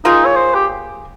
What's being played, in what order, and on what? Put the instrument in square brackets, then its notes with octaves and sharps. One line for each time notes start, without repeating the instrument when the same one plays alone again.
[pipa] A#3 F4 G#4 [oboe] D#4
[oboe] C#5
C5
G4